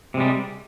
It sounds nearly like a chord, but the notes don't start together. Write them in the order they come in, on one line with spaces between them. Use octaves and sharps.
C3 G#3 G3